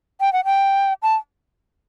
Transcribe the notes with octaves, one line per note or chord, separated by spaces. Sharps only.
G5
F#5
G5
A5